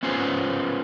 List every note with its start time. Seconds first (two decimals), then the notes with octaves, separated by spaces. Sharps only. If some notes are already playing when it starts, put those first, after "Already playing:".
0.03 B3 C#4 F4 G#4 C5